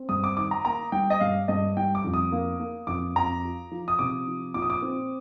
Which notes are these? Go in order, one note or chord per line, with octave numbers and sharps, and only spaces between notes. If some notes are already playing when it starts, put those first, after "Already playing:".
Already playing: C4
G2 D#6
D6
D#3 D6
A#5
A#3 A#5
G3 G5
D#5
G2 F5
G2 D#5
G3 G5
D6
F2
D#6
A#3
A#3
F2 D6
F2 A#5
F4
F3
D#6
C3 D6
F3
A#2 D6
D#6
D6
C4